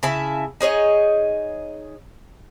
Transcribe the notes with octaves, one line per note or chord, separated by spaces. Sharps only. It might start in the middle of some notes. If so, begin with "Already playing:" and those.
C#3 E4 E5 A5
D#4 G#4 C#5 D#5